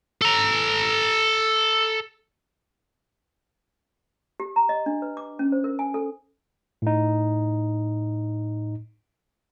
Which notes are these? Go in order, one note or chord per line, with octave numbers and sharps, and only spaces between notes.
A4 A#5
G4
A#5
D#5
D4
B4
D6
C#4
C5
A#4
G#5
A4
A2 D#4